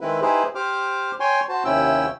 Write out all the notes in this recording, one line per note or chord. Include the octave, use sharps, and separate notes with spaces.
D#3 G#3 C4 E4 B4
D#4 E4 G4 G#4 B4 C5
G4 C5 D6 F6
C#5 G5 G#5 C6
F#4 C5 A5
D#2 C3 C#4 E4 G5 E6